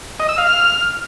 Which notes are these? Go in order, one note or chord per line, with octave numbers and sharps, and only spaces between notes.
D#5
E6
F5
F6